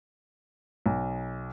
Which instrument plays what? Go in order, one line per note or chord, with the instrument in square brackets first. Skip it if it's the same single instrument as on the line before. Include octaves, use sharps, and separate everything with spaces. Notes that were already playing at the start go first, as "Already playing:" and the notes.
[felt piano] B1